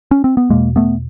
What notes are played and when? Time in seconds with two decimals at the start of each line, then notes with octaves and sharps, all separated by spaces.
0.11 C#4
0.24 C4
0.37 B3
0.50 E2 B2 G#3 A#3
0.76 A3 B3